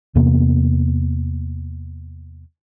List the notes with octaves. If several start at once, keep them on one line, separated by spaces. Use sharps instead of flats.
E2 C3 A#3 B3